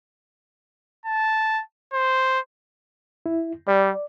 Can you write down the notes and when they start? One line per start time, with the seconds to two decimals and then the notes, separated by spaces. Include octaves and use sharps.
1.06 A5
1.93 C5
3.26 E4
3.68 G3 D5